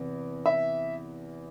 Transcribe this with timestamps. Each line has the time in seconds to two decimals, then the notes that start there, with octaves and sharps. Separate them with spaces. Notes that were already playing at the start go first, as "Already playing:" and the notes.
Already playing: E2 C3
0.46 E5